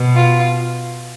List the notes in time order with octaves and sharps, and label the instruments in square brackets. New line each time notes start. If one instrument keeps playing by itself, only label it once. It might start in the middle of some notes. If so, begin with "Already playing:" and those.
Already playing: [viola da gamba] B2
[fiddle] F4